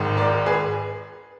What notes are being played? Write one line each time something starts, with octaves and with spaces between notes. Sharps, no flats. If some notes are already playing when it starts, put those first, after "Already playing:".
Already playing: G#1 G#2 D#3
A#4 D5
G#4 B4